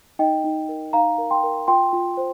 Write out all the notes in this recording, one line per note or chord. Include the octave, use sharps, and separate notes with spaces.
D#4 D#5 G5
D#4
A#4
D#4 F5 A#5
A#4
G5 C6
A#4
F4 G5 C6
F4
C5